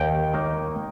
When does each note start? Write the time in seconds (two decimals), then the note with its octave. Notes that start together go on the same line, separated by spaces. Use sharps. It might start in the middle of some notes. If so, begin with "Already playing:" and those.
Already playing: D#2 G5
0.34 D#3 A#3 D#4